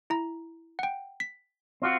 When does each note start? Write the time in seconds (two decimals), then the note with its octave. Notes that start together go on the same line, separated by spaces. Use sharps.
0.10 E4 A#5
0.79 F#5 G5
1.20 B6
1.82 C4 F4 F#4